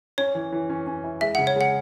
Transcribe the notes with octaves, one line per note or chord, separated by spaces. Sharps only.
C#4 C#5
E3
E3
C#4
C#4
E4
G#3 E5
F#5
C#3
C#5
G#3 F#5